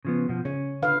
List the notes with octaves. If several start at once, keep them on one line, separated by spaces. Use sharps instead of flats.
C#3 F3 B3
B2 F3
C#3 C#4
D3 B4 F5